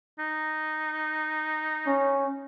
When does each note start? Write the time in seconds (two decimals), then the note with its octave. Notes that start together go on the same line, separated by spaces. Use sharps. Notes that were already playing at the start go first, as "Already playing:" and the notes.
0.19 D#4
1.87 C#4